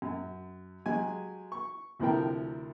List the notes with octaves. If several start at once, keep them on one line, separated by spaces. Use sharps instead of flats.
F#2
F#3 G#3 G4 G#5
C#6
D2 A2 C3 F3 A#4 G5